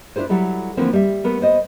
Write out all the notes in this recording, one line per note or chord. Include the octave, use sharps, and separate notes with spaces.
D4 E4 F4 G#4 C5
F#3 G3 E4 A4
D3 E3 F3 A3 A#3 C4
G3 E5
A3 B3 A#4
B3 C5 D#5